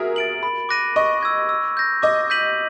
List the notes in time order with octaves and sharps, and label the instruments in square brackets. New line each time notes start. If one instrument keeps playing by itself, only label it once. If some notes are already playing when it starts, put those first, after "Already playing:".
Already playing: [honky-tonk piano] F#4 G#4 A#4 E5
[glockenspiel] A6 D7 F#7
B5
D6 F#6 A#6 D#7
[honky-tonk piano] D#5 [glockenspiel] C#6
[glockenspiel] E6 G#6
E6
G6 A#6
[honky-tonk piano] D#5 [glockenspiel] D6
[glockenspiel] G6 B6 D#7 F#7